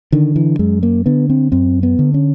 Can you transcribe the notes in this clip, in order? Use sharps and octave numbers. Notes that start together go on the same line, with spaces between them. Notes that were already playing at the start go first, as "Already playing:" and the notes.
D3 D#3
E3
F#2 G#3
A#3
D3 B3
C4
F#2 C4
B3
D3
C#4